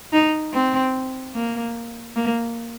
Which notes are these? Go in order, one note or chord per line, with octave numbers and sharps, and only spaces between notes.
D#4
C4
A#3
A#3